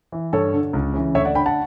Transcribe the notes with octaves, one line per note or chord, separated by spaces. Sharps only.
E3
G2 A4 C#5
D3
C#2
C#3 E3
D2 C#5 E5
D5 F#5
D3 G5 B5
F#5 A5